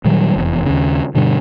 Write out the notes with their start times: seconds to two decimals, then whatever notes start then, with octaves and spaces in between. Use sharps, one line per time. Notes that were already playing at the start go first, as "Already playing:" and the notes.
0.05 A#2 D#3 F#3 G3
0.36 F1 E2
0.66 D#2 C#3
1.15 G2 B2 D3 G3